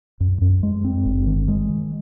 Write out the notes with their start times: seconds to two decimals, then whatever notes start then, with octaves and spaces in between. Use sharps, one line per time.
0.20 F#2
0.42 F#2
0.63 G#3
0.84 C4
1.06 G1
1.27 D#3
1.48 G#3
1.69 D#3